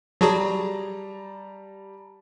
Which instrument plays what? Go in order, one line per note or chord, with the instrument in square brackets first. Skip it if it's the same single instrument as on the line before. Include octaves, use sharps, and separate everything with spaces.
[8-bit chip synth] F#3 F#4 G#4 [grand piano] G3 A5 A#5